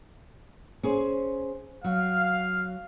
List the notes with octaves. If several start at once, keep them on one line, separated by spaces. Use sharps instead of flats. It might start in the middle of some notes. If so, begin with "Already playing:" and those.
C#4 G#4 C5
F#3 F5